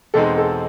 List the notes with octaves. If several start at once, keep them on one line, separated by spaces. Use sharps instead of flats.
E2 B2 G#3 C4 D#4 A4
A4